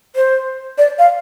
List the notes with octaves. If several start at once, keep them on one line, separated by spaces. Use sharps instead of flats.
C5
D5
F5